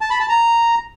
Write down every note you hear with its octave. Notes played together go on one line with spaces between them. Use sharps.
A5
B5
A5
A#5